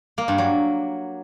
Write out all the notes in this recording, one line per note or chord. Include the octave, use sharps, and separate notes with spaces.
A#3
G2
F#3